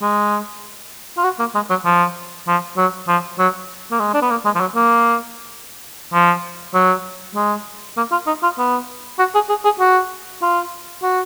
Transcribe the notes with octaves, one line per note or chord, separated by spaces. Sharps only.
G#3
F4
F#4
A#3
G#3
F#3
F3
F3
F#3
F3
F#3
A#3
G#3
D4
B3
A#3
G#3
F3
F#3
A#3
F3
F#3
G#3
A#3
F4
D#4
F4
B3
F#4
G#4
G#4
G#4
F#4
F4
F#4